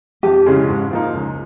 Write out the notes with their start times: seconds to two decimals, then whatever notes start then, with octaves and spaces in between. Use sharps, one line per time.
0.23 F2 G4
0.46 C#3 E3 G#3 C#4
0.68 G#2
0.91 F3 A#3 D#4
1.13 C#2